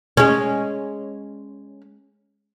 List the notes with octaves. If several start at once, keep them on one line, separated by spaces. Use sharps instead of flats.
G#3 C#4